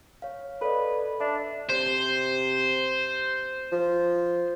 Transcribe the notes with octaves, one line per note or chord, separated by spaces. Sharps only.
C#5 F5
A4 B4 D5 D#5
D4 E5
C3 C5
F3